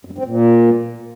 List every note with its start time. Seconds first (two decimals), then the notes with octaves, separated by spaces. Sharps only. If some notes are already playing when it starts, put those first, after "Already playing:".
0.05 F#2
0.12 G2
0.18 C4
0.25 A#2